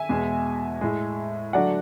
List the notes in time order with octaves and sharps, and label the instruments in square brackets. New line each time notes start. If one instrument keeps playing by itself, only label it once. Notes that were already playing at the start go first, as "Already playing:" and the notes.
Already playing: [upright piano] E5 G#5
E2 B2 G#3
A2 G#3
D3 F#3 A3 D5 F#5